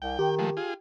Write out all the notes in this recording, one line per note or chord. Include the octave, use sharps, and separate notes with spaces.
C2 G5
D#3 G4
F3 G#3 A3
F4 G#4